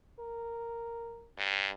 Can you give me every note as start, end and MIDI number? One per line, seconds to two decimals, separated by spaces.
0.20 1.27 70
1.38 1.69 43